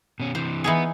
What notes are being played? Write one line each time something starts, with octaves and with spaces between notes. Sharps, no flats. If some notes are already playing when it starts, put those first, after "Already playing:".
B2 C#4
C3 E3 C5
E3 B3 D#4 G#4